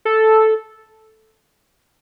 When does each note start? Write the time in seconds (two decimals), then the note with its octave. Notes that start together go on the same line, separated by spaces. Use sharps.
0.05 A4